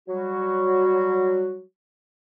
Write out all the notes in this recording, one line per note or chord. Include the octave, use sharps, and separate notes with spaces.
F#3 G3 F#4